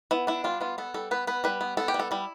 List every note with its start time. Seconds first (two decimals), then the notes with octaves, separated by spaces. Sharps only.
0.11 B3 E4
0.27 D4 E4
0.44 G3 F4
0.61 B3 F4
0.78 B3 A4
0.94 G3 A4
1.11 B3 B4
1.27 B3 B4
1.44 G3 B4
1.61 B3
1.77 B3 A4
1.88 G4
1.94 G3
1.99 A4
2.11 G3 E4